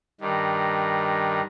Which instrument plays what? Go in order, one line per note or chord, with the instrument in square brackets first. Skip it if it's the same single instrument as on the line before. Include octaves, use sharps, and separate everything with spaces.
[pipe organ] G2 D#3